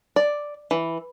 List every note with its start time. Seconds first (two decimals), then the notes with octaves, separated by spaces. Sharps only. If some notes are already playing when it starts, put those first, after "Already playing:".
0.16 D5
0.71 E3